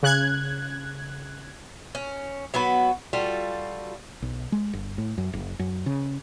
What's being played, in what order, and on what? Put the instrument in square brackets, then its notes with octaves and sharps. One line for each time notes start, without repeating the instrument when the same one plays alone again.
[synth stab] C#3 F#6 G#6
[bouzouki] C#4
F#3 B3 F#4 B4
G3 F4 F#4 A4
[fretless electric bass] B1
G#3
G1
A2
F#2
F#1
F#2
C#3